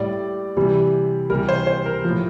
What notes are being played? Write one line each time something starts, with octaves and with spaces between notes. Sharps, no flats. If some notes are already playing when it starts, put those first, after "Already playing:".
Already playing: A2 G3 D5
C3 E3 G3
C3 E3 G3 A#4
C5
C5
A#4
A2 F3